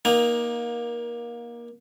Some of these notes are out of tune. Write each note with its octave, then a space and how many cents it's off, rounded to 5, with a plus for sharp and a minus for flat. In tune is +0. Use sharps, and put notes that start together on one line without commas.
A#3 +25 D#4 +10 G#5 -40